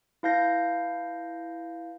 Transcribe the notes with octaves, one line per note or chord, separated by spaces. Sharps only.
E4 B4 F5 A5 G6 A#6